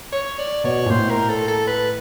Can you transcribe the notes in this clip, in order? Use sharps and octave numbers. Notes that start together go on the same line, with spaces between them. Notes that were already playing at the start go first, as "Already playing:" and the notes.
C#5
D5
B2 C#5
A#2
A2 C5
A#4
A4
A4
B4